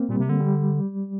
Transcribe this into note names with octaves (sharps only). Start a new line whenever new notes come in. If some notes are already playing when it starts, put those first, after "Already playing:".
Already playing: A#3 C4
A#2 G3
C3
D3
G3